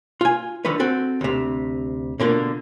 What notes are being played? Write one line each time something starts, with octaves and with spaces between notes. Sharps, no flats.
F4 G#5
D3 D#3 F3 A3 B4
C4 F#4 A4
D2 C3
B2 D3 A#3 F4